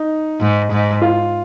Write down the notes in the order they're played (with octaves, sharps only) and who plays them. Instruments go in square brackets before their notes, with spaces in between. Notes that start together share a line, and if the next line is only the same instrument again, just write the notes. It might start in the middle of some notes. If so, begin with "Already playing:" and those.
Already playing: [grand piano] D#4
[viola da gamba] G#2
G#2
[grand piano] F4